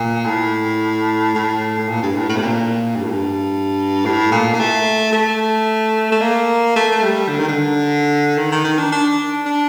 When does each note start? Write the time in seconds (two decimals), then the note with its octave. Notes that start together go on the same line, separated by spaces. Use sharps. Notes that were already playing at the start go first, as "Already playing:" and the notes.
Already playing: A#2
0.26 A2
1.35 A2
1.79 A2
1.88 A#2
2.02 G2
2.16 A2
2.29 A2
2.36 C3
2.42 A#2
2.96 G2
3.04 A2
3.11 G2
4.05 A2
4.32 A#2
4.54 A#3
4.59 A3
5.13 A3
6.12 A3
6.21 A#3
6.76 A3
6.92 A3
7.02 G3
7.29 D3
7.39 D#3
7.49 D3
8.38 D#3
8.52 D#3
8.64 D#3
8.78 D4
8.92 D4
9.46 D4